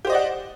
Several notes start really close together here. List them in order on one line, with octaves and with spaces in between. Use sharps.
G4 C5 D#5 D5 F#5